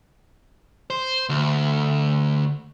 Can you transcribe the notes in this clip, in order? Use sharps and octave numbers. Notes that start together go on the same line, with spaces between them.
C5
D2